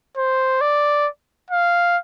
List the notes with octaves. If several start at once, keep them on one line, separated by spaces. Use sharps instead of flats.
C5
D5
F5